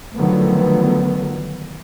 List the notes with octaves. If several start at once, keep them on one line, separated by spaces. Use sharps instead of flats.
D3 D#3 F3 F#3 A3 B3